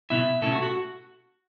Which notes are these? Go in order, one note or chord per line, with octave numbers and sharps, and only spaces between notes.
B2 B3 E4 E5
B2 A3 C#4 E4 A4
F#4
F#4